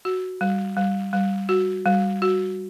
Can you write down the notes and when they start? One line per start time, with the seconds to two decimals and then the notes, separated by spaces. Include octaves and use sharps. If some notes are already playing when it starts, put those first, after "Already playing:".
0.05 F#4
0.41 G3
0.77 G3
1.13 G3
1.49 F#4
1.86 G3
2.22 F#4